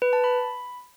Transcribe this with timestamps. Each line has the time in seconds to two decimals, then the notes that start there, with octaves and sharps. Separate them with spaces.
0.02 B4
0.13 A5
0.24 B5